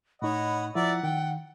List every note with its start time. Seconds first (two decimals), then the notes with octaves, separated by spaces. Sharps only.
0.22 A2 D#4 C#5 D#5 F#5 B5
0.75 F3 E4 A#4 D5 E5 F#5
1.03 D#3 G5